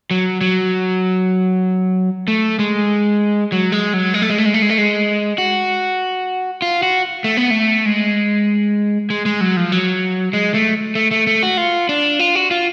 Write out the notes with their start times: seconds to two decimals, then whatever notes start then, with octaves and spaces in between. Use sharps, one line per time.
0.11 F#3
0.41 F#3
2.28 A3
2.59 G#3
3.52 F#3
3.72 G#3
3.94 F#3
4.14 G#3
4.22 A3
4.30 G#3
4.38 A3
4.46 G#3
4.54 A3
4.62 G#3
4.70 A3
4.78 G#3
5.38 F#4
6.62 F4
6.83 F#4
7.24 A3
7.37 B3
7.50 A3
7.86 G#3
9.10 G#3
9.26 G#3
9.41 F#3
9.57 F3
9.72 F#3
10.33 G#3
10.54 A3
10.95 A3
11.11 A3
11.27 A3
11.43 F#4
11.57 F4
11.89 D4
12.19 F4
12.35 F#4
12.51 F4